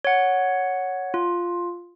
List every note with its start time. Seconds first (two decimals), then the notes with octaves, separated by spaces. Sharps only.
0.05 C#5 F#5
1.14 F4